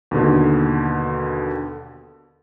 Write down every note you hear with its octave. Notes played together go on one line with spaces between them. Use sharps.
D#2 B2 D3